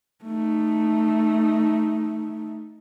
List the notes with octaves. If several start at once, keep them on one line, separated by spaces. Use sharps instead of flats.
A3 D#4